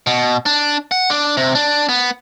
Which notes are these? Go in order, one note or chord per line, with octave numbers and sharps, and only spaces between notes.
B2
D4
F#5
D4
C3
D4
B3